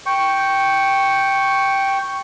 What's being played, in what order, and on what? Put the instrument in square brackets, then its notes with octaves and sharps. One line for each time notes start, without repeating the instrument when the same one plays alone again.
[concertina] G5 C#6